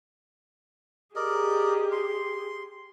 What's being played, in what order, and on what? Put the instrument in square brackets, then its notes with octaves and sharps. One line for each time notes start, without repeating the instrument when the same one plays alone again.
[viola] G4 G#4 [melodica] A#4 D5 D#5
[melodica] C6